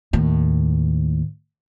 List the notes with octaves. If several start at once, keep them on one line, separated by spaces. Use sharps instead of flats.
D#2 A2